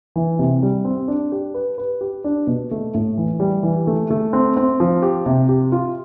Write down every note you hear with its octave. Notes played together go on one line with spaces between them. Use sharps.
E3
C3
G3
C4
D4
G4
B4
B4
G4
D4
B2
A3
A2
E3
G3
E3
A3
A3
C4
C4
F3
G4
C3
G4
F4